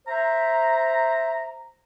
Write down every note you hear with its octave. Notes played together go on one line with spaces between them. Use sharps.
C5 E5 A#5